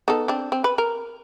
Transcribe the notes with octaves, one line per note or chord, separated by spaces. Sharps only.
B3 D#4 A4
C4 D4
C4
B4
A#4